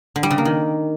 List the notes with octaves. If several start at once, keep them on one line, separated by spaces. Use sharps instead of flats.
D3
G3
C#3
A#3
D#3